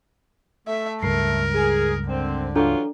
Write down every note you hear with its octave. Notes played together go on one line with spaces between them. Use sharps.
A3 E5
C#2 G2 A#4 C7
G#4
D3 C4
E3 F#3 D4 F4 A4 A#5